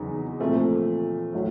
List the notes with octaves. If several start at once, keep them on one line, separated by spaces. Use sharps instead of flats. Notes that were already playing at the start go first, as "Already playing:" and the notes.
Already playing: E2 C#3 F#3 D#4
A#2 F3 A3 C4
A2 F#3